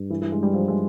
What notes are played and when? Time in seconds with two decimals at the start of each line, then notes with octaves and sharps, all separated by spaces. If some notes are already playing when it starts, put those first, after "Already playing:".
Already playing: G2
0.10 E3
0.22 E3
0.32 G#3
0.43 G3
0.54 F3
0.68 G#3